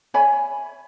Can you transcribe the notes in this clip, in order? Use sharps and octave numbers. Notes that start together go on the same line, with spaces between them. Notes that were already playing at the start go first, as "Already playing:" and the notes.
C#5 E5 G#5 B5